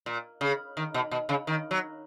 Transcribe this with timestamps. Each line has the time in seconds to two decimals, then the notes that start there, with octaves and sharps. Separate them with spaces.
0.06 A#2
0.41 C#3
0.77 D#3
0.94 B2
1.11 B2
1.29 C#3
1.47 D#3
1.71 F#3